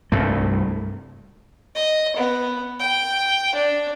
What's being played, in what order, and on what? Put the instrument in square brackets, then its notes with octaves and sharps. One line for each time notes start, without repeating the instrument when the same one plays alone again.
[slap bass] C2 G2 A3
[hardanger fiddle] D#5
B3
G5
D4